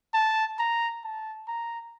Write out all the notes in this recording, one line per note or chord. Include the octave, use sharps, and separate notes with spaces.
A5
A#5
A5
A#5